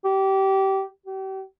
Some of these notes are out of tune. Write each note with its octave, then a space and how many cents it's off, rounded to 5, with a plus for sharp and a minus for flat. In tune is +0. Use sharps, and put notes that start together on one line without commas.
G4 -20
G4 -40